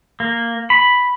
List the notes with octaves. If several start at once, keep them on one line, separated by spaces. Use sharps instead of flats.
A#3
B5